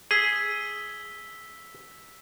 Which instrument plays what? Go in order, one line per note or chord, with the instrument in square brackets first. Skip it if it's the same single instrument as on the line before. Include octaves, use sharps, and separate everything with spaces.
[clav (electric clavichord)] G#4 [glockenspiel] E6 B6 G7